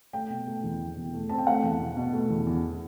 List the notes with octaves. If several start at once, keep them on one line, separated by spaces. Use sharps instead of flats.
A3 G5
B2
A3
E2
B2
E2
A3
C4 A5
G5
A3 F#5
E2
B2
B2
A3
E2
E2